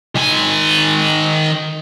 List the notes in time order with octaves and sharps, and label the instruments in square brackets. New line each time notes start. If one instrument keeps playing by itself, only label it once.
[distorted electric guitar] D#3 G#5